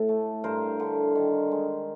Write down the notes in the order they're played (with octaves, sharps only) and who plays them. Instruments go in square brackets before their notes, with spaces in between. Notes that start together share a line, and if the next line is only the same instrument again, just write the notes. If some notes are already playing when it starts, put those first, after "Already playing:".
Already playing: [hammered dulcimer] A2 A4
A3
G2 A#4 C5
D3
D#3
G#3